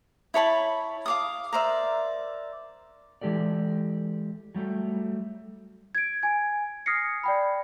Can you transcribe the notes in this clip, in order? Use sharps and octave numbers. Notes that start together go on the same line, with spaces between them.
E4 C#5 A5 B5
F5 D6 D#6
A#4 C5 D5 E5
E3 G#3 G4 A4 D5
F#3 G3 A3
G#6 D7
G#5 G#6
D#6 F6 G#6 A#6 C7 C#7
D5 G5 B5